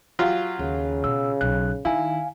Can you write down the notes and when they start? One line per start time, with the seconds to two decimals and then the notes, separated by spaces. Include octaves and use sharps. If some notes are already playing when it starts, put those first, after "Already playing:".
0.19 F#3 F4 G4
0.59 D#2 C#3
1.04 B2 E6
1.41 B1 F#6
1.85 D#3 E4 F5 G#5